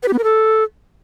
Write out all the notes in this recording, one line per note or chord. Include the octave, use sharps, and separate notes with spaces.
B4
G4
B3
A#4
A4